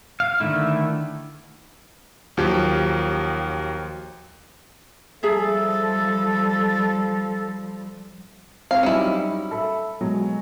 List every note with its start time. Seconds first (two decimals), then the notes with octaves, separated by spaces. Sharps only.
0.20 F5
0.40 D3 D#3 A3 E4
2.37 D#2 F3 F#3 G4
5.23 F3 G3 G#4 A4 E5 A#5
8.71 C4 G#4 F5
8.83 F#3 G3 C#4 D#4 E4
9.51 A4 E5 B5
10.01 B2 F#3 G#3